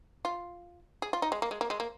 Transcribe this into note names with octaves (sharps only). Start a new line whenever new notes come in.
F4
G#4
F4
D#4
G#3
A#3
G#3
A#3
G#3
A#3